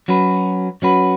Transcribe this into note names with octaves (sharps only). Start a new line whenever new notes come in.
F#3 C#4 F#4 B4
F#3 C#4 F#4 B4